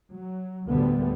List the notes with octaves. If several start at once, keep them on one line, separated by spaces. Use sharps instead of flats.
F#3
D2 A2 D3 G3 A3 B3